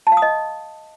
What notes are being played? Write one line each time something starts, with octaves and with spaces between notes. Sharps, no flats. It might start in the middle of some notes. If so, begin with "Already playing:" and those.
A5
F5
D#6
D#5